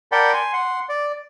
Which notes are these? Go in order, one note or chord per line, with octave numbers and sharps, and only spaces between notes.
A#4 D5 F#5 G5 A5 B5
G#5 C6
F#5 C6
D5